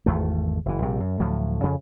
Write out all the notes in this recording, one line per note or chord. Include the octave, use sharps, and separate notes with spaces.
G#1 E2 A3
F#1 E3
A#1 C3 G3
F#2
D2 A2 F3 F#3
F2 C#3